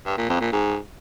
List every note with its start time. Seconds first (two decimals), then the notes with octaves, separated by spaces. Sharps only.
0.06 G2
0.18 A#2
0.29 F2
0.41 A#2
0.52 G#2